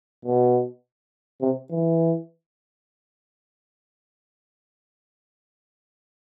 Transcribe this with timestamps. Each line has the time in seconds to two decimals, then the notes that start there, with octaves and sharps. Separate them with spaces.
0.25 B2
1.41 C3
1.70 E3